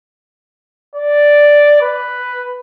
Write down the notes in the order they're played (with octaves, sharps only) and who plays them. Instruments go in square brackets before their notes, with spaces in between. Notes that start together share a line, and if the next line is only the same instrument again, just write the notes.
[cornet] D5
B4